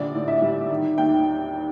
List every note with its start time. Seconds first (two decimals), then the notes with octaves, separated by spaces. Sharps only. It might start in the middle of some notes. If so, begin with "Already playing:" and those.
Already playing: A#1 D3 G3 D5
0.14 A2
0.28 E5
0.42 G3
0.70 D#3
0.98 D#2 G5